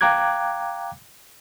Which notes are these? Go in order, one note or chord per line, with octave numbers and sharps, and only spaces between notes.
F5 G5 A#5 D6 F#6 G#6